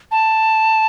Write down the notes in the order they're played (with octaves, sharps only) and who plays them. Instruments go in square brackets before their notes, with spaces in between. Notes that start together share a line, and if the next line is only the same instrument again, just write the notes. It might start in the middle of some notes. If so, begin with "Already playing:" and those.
[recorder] A5